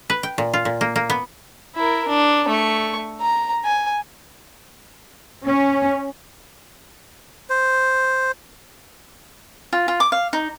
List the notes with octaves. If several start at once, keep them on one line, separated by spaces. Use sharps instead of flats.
B4
G5
A#2
F4
A#2
A#3
A#3
B3
E4 A#4
D4
A3 C#6
A#5
G#5
C#4
C5
F4
F4
D6
F5
D#4